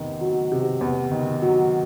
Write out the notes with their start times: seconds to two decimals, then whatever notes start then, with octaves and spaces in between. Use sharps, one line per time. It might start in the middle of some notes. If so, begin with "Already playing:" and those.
Already playing: E2 C3 D#3
0.21 F#3
0.52 C3
0.81 E2
1.11 D#3
1.42 F#3